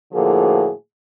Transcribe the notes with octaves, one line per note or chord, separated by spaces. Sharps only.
A2 D3 F3 A#3 F#4 G#4